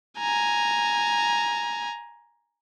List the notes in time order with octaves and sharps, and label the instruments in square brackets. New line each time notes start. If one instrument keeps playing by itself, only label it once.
[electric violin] G#5 A#5